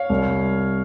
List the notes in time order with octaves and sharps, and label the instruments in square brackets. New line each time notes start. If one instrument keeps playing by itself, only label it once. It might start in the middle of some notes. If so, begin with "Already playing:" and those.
Already playing: [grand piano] C#5 F5
C2